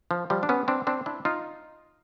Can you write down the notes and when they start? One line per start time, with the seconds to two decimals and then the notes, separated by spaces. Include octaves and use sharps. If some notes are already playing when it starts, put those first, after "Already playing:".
0.11 F3
0.30 F3 G3
0.43 D4
0.49 B3 C#4
0.68 C4 D4
0.87 C4 D4
1.06 D4 E4
1.25 D#4 F4